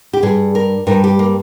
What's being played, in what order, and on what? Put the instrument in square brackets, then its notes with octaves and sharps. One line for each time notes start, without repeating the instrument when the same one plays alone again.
[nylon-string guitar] G4
G2 G3 G#4
A#4
G2 G3 A#4
G4
A#3